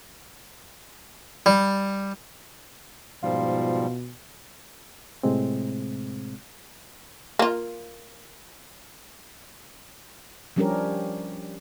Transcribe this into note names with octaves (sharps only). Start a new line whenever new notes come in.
G3
G#2 B2 F3 G3 F4
A2 C3 G#3 C4
A#3 F4
F3 G3 C#4 D4 G4 A#4